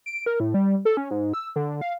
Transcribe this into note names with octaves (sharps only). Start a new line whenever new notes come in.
D7
A#4
A2
G3
A4
C#4
G#2
E6
D3
F5